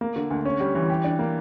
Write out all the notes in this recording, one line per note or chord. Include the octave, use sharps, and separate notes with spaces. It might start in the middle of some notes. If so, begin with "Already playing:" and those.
A#3
D3
D2
C#4
G3
E3
G4
D4
A#3